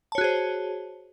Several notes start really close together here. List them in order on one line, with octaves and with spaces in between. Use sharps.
A5 C#5 F#4 G#4 C5